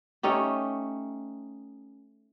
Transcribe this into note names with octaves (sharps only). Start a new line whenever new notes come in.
A3 C#4 D#4 G4